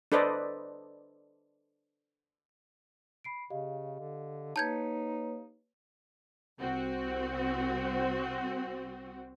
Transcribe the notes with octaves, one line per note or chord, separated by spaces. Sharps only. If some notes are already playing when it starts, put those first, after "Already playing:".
D4 A4 B4 C5 D5 D#5
B5 C7 D7
C#3 G4 D#5 F5
D3
A#3 D#4 B4 C#5 A5 G6 G#6
C2 C4 F#4